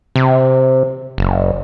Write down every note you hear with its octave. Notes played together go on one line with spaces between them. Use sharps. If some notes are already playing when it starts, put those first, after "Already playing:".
C3
F#1